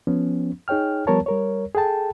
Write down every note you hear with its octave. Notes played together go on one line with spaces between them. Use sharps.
F3 B3 C#4
D#4 G#4 C#5 G5 F6
F3 G3 B3 A#4 C#5 A5
G3 A#4 C#5
G#4 A4 G5 A5